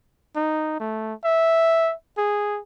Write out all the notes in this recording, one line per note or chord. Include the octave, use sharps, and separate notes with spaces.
D#4
A3
E5
G#4